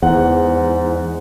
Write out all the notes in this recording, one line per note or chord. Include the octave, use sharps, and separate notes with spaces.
E2 G#2 F#5